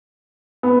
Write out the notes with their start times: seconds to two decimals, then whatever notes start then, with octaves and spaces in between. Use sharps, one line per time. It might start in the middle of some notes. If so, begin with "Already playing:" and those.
0.63 B3